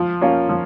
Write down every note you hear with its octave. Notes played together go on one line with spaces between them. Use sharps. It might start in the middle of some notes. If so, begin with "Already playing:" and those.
Already playing: F3
A#3 C#4 F4
F3